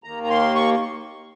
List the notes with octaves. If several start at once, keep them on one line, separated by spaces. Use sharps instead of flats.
D#2 D#3 A#3 A#5
A#5
C6
C#6